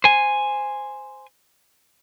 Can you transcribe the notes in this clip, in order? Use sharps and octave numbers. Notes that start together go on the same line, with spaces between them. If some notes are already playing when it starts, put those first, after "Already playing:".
C5 G#5